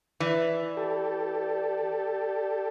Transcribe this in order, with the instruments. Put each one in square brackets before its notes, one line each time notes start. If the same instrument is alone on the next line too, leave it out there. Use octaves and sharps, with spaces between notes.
[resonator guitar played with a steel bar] E3 [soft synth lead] D5
[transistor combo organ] G4 A4